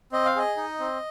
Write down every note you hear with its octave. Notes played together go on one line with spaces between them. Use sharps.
C4 D#5
F5
G#4 D#5
D#4
C4